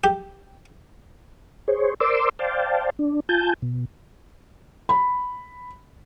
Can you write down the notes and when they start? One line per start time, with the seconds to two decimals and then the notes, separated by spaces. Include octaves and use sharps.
0.04 G4
1.68 G#4 C5 C#5
2.00 A#4 C5 D5 C6 D6 E6
2.39 C5 D5 F5 G5 A5
2.99 D4
3.29 F4 G#5 A5 G6
3.62 B2
4.89 B5